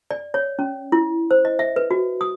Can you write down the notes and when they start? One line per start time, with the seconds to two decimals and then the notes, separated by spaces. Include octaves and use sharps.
0.11 D5
0.34 C#5
0.59 C#4
0.92 E4
1.31 C5
1.45 D#5
1.59 E5
1.76 B4
1.91 F#4
2.21 D#6